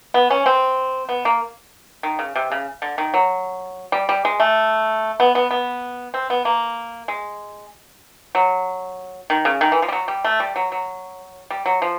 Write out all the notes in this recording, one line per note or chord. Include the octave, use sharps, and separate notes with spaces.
B3
C#4
C4
B3
A#3
D#3
C#3
C3
C#3
D3
D#3
F#3
G3
G3
G#3
A3
B3
B3
B3
C4
B3
A#3
G#3
F#3
D#3
C#3
D#3
E3
F3
G3
F#3
G3
A3
G3
F#3
F#3
G3
F#3
F3